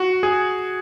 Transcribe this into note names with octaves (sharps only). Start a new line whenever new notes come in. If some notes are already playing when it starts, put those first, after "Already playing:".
Already playing: F#4
G#4